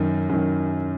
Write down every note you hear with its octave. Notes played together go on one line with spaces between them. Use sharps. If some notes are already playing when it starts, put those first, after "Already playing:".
Already playing: F#2 D#3
F#2 D#3